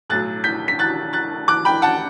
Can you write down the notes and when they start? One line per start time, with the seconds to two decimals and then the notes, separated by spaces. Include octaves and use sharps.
0.10 B1 A2 F#3 F#6 A6
0.44 G6 B6
0.68 B6
0.79 F#6 A6
1.13 F#6 A6
1.48 D6 F#6
1.65 G5 B5
1.82 F#5 A5